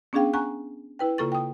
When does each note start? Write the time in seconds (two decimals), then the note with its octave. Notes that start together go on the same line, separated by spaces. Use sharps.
0.13 B3 C#4 D4 G#4 F5 G5
0.33 F#5 G#5 A#5 C#6 F#6
0.99 E4 B4 G5
1.18 C#3 A#3 F4 A4 C#6 A6
1.32 G5 D#6